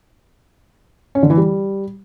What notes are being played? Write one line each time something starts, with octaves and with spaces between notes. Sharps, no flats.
C#4
D3
E3
G3